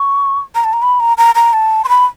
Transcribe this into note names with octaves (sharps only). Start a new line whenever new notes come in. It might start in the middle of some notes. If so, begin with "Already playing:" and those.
Already playing: C#6
A#5
A5
A#5
B5
A#5
A#5
A#5
A5
C6
B5